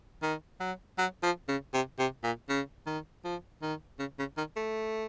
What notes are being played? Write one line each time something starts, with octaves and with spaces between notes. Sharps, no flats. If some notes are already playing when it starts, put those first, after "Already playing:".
D#3
F#3
F#3
F3
C#3
C3
C3
A#2
C#3
D#3
F3
D#3
C#3
C#3
D#3
A3